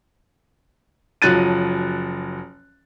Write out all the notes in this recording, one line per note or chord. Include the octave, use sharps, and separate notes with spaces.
F#1 F3 F#3 F#6 A6 D#7